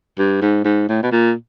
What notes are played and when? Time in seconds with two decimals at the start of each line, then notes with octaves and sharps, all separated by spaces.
0.19 G2
0.42 G#2
0.64 G#2
0.88 A2
1.03 B2
1.12 A#2